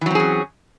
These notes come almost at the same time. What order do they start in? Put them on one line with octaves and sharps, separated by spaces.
E3 F#3 C4 G#4 C#4